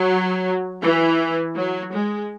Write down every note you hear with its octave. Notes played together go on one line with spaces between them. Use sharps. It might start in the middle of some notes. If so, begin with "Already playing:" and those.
Already playing: F#3
E3
F#3
G#3